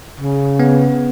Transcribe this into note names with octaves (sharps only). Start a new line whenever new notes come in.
C#3
B3